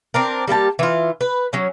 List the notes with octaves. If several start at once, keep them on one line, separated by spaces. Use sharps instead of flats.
C4 D4 A#4
G3 A#3 G4 A5
E3 F4
B4
F#3 C#4